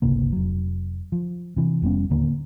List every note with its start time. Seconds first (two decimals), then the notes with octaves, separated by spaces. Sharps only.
0.02 G1 C#2 C3 A#3
0.32 F1 F#3
1.12 F3
1.57 C3 E3
1.82 F1 G3 B3 C#4
2.10 D1 D#2 D3 A#3